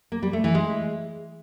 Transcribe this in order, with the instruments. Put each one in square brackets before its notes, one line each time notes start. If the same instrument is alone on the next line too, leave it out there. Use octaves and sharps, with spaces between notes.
[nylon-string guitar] A#3
G3
A3
E3
G#3